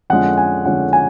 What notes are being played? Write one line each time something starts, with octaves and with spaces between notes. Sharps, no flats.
F2 D3 G#3 C#4 F4 F#5
G#5
F2 D3 G#3 C#4 F4 F#5
G#5